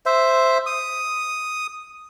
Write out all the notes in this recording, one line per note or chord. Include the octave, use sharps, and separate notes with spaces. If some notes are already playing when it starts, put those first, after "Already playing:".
C5 E5
D#6